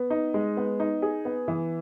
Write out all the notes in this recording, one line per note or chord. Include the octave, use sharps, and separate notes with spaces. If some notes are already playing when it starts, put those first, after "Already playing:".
Already playing: B3
D#4
G#3
B3
D#4
G#4
B3
E3